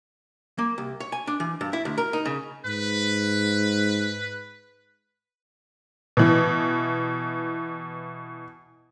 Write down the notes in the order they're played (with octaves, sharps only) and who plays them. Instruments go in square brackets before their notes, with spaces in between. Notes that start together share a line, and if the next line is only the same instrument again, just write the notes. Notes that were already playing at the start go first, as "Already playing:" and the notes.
[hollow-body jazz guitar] A#3
C2
C#5
G#5
D4
E3
G2
E4
D2
A#4
D#4
C#3
[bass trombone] G#2 [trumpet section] B4
[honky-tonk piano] B2 E3